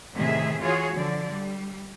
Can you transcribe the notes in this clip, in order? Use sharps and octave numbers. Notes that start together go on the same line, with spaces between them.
A2 C3 D#3 G#4 E5
E3 F4 F#4 G#4 C#5
D3 F3 D5
G3